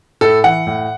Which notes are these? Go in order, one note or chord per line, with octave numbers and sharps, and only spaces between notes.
A2 A4
E3 F#5
A2